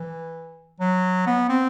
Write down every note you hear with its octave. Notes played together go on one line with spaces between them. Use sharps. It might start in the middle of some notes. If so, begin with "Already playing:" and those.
Already playing: E3
F#3
B3
C4